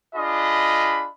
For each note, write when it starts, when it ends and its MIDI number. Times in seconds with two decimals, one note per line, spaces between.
0.16 1.07 62
0.16 1.07 65
0.16 1.07 68
0.16 1.07 75
0.16 1.07 83